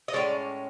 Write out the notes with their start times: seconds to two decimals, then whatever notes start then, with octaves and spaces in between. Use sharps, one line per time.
0.08 D#5
0.13 A2 E3 G#3 C#4 D5